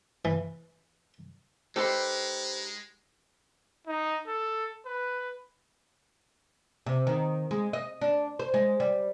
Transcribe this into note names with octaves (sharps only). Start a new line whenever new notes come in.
E3
G#3 D#4 G4 A4 B4 C5 C6
D#4
A4
B4
C3
D#3
G#3
D#5
D4
C5
G#3
G3